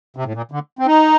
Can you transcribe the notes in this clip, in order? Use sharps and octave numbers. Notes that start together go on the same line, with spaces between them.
C3
A2
A#2
D3
C4
D#4